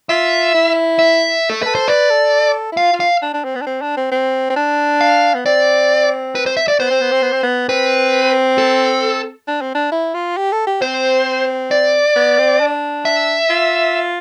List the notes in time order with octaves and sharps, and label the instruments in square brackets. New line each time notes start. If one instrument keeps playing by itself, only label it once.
[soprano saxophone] F4 [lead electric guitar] E5
[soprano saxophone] E4
[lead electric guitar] E5
A4
[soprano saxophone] A4 [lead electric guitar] B4
[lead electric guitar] C5
[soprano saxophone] B4 [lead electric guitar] D5
[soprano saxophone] A4
E4
[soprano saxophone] F4 [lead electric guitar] F5
[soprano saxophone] F4
[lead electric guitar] F5
[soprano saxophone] D4
D4
C4
B3
D4
C4
D4
C4
C4
C4
D4
[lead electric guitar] F5
[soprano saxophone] B3
[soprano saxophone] C4 [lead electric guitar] D5
[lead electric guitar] B4
C5
E5
D5
[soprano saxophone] B3 [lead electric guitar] C5
[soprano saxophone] C4
B3
C4
B3
C4
B3
[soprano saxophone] C4 [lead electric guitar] B4
[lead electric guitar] A4
[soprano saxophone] D4
C4
D4
E4
F4
G4
A4
G4
[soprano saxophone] C4 [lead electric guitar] C5
[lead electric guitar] D5
[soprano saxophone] B3
C4
D4
[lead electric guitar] E5
[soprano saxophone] F4